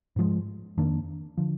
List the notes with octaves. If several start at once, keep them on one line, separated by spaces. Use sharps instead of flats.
G#2 F3 G#3
F2 D#3 A#3 D4
D3 F3